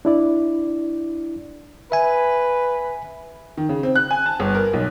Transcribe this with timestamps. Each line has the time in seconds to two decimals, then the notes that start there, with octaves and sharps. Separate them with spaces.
0.05 D4 E4 D5
1.92 B4 E5 G#5
3.57 D#3
3.69 C#3
3.83 C4
3.96 F#6
4.11 G#5
4.26 A5
4.40 G1
4.55 A#4
4.73 B1